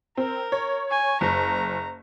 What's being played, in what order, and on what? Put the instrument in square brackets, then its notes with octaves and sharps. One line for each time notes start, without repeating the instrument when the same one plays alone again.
[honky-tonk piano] C4 [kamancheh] A#4
[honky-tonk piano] C#5
[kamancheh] G#5 C#6
[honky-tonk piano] F#1 [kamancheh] A#5